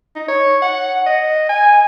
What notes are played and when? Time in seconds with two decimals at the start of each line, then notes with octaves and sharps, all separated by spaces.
0.15 D#4
0.28 C#5
0.62 F#5
1.06 D#5
1.49 G#5